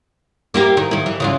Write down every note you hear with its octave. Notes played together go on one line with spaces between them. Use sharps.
A#3 E4 G4
D#3
D#3 E4
E3
C#3 E3 F4